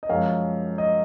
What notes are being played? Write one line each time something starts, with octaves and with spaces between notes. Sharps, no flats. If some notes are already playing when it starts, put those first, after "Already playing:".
D#5
F#2 F3 G#3 F5
D#5